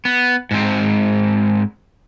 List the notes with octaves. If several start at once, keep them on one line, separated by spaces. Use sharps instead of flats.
B3
G#2 C4